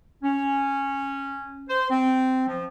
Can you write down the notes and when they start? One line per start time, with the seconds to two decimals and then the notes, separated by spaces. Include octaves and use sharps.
0.23 C#4
1.68 C5
1.89 C4
2.47 F3